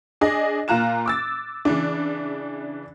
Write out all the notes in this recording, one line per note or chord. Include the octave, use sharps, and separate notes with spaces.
D4 G#4 D#5
A#2 F4 A#5 F#6 E7
D6 E6 A6
C#3 E3 D4